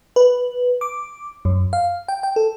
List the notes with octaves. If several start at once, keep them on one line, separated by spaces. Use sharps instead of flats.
B4
D6
F#2
F5
G5
G5
A4